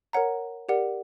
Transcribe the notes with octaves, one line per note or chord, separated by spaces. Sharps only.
A#4 C#5 F#5 A#5
G4 A#4 D5 F#5